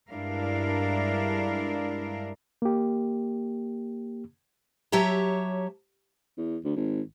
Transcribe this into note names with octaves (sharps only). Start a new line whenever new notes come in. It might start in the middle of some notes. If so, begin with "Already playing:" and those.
G2 G#3 D4 E4 A#4 F5
A#3 G4
F#3 G4 C#5 E5 A5 A#5
E2
D2
G#1